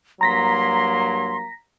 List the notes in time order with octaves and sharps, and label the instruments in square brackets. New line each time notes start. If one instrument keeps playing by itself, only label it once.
[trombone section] G2 F#3 A#3 [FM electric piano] A#5 A#6 B6 [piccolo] C6